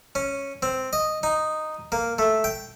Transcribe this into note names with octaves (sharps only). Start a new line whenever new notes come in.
C#4
C4
D#5
D#4
A#3
A3
G5